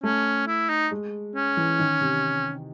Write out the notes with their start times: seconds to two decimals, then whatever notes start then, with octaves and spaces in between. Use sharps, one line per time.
0.03 A3 C#4
0.47 E4
0.69 D#4
0.91 G#3
1.35 C#4
1.57 E3
1.79 D#3
2.01 C3